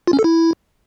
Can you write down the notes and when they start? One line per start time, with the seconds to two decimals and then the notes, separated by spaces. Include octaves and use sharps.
0.07 F4
0.13 C#4
0.19 A4
0.24 E4